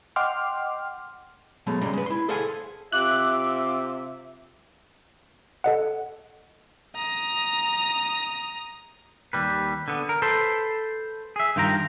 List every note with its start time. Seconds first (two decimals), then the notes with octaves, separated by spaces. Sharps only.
0.16 D#5 F#5 G5 C6 D6 F6
1.67 B2 F#3 G#3 A3
1.81 G2 C#3 G3 G#3 A#5
1.93 G#3 B4
2.06 E4 C6
2.28 G#4 A4 C5 F5 F#5 G#5
2.92 C3 F4 E5 D6 F#6
5.64 A4 D#5 F#5
6.96 A#5 D#6
9.33 D#2 G3 B4
9.88 D3 B3
10.09 A#4
10.22 A4 B4 C5
11.36 G#4 E5
11.56 G2 D#3 F4 G5 A#5